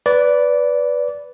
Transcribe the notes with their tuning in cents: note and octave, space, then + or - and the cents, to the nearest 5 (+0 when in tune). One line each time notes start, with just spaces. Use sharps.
B4 +0 D5 -15